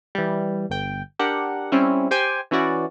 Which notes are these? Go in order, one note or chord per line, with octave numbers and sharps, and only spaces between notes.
E3 G3
G1 G5
D4 G4 A#4 F#5
G3 C4 C#4 E4
G4 C5 G5 G#5
E3 C#4 E4 F#4 D5